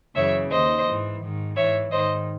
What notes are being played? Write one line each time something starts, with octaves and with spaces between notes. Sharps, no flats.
F#2 C#3 E3 C#5 E5
D#2 D#3 C5 D#5
G#2 E3
G#2 D#3
G#2 E3 C#5 E5
G#2 D#3 C5 D#5